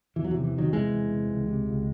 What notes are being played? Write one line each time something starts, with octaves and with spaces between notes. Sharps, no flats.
E2 E3
F#3
C3 E3
E3
E2 D#3 F#3
C3 E3 G#3
E2
C3
C#2
C3
C#2